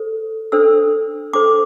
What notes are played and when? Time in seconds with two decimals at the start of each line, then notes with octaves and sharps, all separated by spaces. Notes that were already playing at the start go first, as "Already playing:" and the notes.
Already playing: A4 C5
0.52 D4 A4 C5 E6
1.33 D4 A4 C5 D6